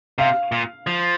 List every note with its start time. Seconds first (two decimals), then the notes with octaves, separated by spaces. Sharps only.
0.18 C3 F5
0.52 A#2
0.87 F3